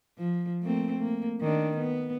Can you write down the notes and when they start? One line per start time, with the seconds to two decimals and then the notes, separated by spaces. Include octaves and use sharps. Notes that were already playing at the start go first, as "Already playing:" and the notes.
0.18 F3
0.62 A3 A#3 C4
0.98 A#3
1.41 D#3 D4
1.77 B3